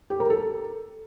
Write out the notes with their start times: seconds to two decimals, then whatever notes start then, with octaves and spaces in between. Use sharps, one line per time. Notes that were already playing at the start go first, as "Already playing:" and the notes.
0.10 G4
0.20 A#4
0.30 A4